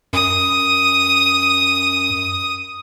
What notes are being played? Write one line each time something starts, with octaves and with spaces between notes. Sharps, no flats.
F#2 D#6